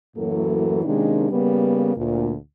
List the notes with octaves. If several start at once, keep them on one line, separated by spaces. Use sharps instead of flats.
F#2 A2 E3 F#3 A#3 A4
C3 D#3 G#3 A#3 C#4 D4
C#3 G3 A#3 B3
D2 A#2